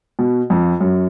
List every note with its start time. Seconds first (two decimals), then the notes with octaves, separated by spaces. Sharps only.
0.19 B2
0.50 F2
0.80 F#2